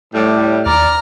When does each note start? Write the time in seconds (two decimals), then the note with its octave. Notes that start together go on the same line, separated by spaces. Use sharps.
0.14 A2 G3
0.66 D#2 D5 A#5 F6